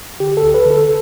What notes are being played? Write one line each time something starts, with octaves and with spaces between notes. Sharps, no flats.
D3 G4
A4
D2
B4
D3 A4